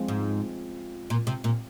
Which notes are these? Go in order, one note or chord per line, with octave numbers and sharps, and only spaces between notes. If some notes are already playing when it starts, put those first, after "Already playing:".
Already playing: F3 G#3 C4 F4
G#2
A#2
C3
A#2